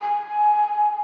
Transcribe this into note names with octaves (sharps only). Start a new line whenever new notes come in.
G#5